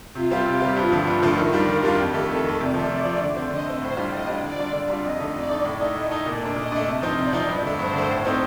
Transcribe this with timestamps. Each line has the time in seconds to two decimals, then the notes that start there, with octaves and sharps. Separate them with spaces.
0.15 C3 F4
0.31 G3 C4 F4
0.46 C3 G4
0.60 G3 C4 F4
0.76 G2 F4
0.92 D3 F3 A3
1.07 G2 F4
1.22 D3 F3 A3
1.37 D#3 D#4
1.53 G3 D4 F4
1.68 D#3 A#4
1.83 G3 D4 F4
1.98 F2 G4
2.14 D#3 A3
2.29 F2 A4
2.44 D#3 A3
2.60 C3 D5
2.74 F3 A3
2.90 C3 D5
3.05 F3 A3
3.21 D3
3.36 A3 C4
3.51 D3 D#5
3.66 A3 C4
3.82 A2 C5
3.97 G3 D4 F4
4.12 A2 D#5
4.27 G3 D4 F4
4.43 D3 D5
4.58 G3 D4 F4
4.73 D3
4.88 G3 D4 F4
5.03 F2 D#5
5.19 D3 A3 D#4
5.34 F2 D5
5.49 D3 A3 D#4
5.65 A2
5.80 A3 D#4
5.95 A2 D#5
6.11 A3 D#4
6.26 A#2 D5
6.42 A3 D4
6.56 A#2 D#5
6.72 A3 D4
6.87 C3
7.02 F3 C4 D#4
7.17 C3 D5
7.33 F3 C4 D#4
7.49 G2
7.63 D3 A3
7.78 G2 C5
7.93 D3 A3
8.09 A2
8.25 A3 C4 D#4